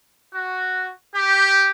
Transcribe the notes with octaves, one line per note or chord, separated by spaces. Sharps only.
F#4
G4